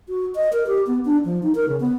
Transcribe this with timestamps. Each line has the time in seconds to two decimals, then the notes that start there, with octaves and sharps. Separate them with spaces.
0.09 F#4
0.36 D#5
0.53 A#4
0.67 G4
0.87 B3
1.05 D4
1.25 F3
1.43 D#4
1.55 A#4
1.68 C#3
1.80 B3